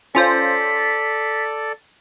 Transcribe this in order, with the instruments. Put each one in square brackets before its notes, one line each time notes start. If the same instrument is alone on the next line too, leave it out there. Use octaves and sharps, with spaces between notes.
[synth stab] C#4 F4 C5 [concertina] A4 D5 [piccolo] B6